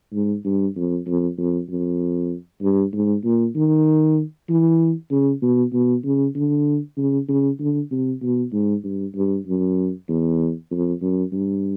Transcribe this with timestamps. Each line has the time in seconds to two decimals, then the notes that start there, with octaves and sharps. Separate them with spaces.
0.14 G#2
0.45 G2
0.76 F2
1.07 F2
1.38 F2
1.69 F2
2.62 G2
2.93 G#2
3.24 A#2
3.56 D#3
4.50 E3
5.11 C#3
5.42 B2
5.73 B2
6.04 C#3
6.35 D3
6.97 C#3
7.28 C#3
7.60 D3
7.91 C3
8.22 B2
8.53 G#2
8.84 G2
9.16 G2
9.47 F#2
10.09 E2
10.71 F2
11.02 F#2
11.32 G2